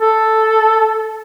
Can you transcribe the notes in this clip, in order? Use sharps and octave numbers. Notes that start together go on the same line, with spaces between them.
A4